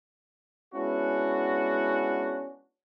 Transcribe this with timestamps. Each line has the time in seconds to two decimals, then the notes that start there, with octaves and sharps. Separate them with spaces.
0.74 G#3 B3 C#4 D4 E4 F#4